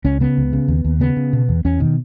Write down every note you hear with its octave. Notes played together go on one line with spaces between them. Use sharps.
C#2 C#4
C#3 B3
C#2
C#3
D#2
D#2
C#3 B3
C#3
B2
E2
E2 C#4
B2 D#3